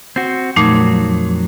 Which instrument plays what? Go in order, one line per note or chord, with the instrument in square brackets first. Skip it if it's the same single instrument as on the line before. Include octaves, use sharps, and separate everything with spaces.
[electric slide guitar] C4 F#4
[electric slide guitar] F2 F#3 [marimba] A#2 A3 D#4